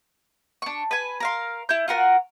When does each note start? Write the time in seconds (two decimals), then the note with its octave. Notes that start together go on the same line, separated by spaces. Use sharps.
0.62 D4 C#6
0.91 B4 G#5
1.20 A#4 F5 C6
1.69 E4 G6
1.88 F4 F#4 A#4 F#5